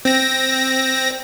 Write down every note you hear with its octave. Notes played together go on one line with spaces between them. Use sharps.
C4 A#6